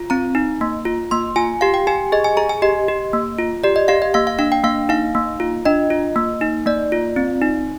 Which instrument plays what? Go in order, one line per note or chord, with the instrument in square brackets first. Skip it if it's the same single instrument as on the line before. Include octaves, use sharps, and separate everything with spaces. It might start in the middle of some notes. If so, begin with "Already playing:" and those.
Already playing: [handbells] F4
C4 A#5
D#4
A#3
F4
A#3 C6
F4 G#5
G4 F5
G5
G4 G#5
G#4 D#5
G#5
G#4 A#5
G#5
G4 D#5
G4
A#3
F4
G4 D5
D#5
G4 F5
D#5
A#3 F5
F5
D4 F5
G5
A#3 F5
D#4 F5
A#3
F4
D4 D#5
F4
A#3
D#4
A#3 D5
F4
C4
D#4